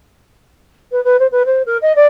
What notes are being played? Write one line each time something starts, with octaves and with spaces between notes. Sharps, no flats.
B4
B4
C5
B4
C5
A#4
D#5
D5